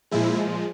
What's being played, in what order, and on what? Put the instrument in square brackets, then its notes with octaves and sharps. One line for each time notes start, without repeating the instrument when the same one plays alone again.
[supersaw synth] A#2 F3 G#3 E4